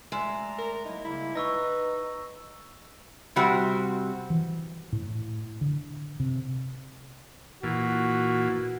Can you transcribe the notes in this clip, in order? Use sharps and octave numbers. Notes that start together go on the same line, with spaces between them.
G#3 A3 D5 E5 A#5
A#4
F#3 A#3 D#4 E4
C#3 G3 A#3 E4
D#4 B4 C#6 E6 A#6
C3 G3 C4 F#4
E3
A2
D3
C3
A#2 E3 F#4